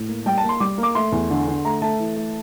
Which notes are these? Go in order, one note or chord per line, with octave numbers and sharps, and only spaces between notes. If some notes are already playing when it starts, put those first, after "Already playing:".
Already playing: A2
A#3
G3 G5
A5
A#3
C6
G3 D6
A#3
D6
A3 C6
E2
D3
D3
A3 A#5
A3 A5
E3
A3